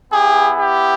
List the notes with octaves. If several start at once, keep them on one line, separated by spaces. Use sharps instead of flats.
B3 E4 G4 G#4
G4